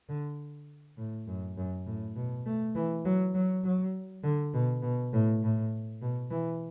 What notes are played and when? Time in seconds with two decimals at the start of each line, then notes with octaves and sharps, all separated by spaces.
0.09 D3
0.97 A2
1.27 F#2
1.57 F#2
1.86 A2
2.16 B2
2.46 A3
2.75 E3
3.05 F#3
3.35 F#3
3.64 F#3
4.24 D3
4.54 B2
4.83 B2
5.13 A2
5.43 A2
6.02 B2
6.31 E3